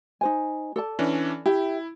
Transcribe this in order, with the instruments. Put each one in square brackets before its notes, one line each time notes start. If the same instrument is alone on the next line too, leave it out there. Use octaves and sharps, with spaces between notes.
[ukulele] D#4 C5 G#5
A4 D5 A5
[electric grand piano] E3 C#4 D4
[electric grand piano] E4 [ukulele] G4 E5